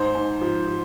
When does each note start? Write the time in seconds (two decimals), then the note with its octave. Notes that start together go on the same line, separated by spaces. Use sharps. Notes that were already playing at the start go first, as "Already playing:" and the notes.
Already playing: G#2 C5
0.15 G#2
0.41 F3
0.67 F3